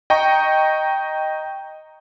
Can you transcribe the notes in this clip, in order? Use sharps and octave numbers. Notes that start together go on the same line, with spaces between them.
D#5 G5 A#5 C#6